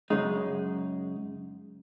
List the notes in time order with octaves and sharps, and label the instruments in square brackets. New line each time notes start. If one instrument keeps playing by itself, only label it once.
[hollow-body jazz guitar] F#2 C#3 G#3 D#4